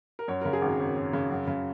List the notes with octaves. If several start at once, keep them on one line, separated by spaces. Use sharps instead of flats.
A#4
F#2 C#5
C#3 A#4
G#4
G#1 F#3
G#1
F#2
C#3
F#2
C#3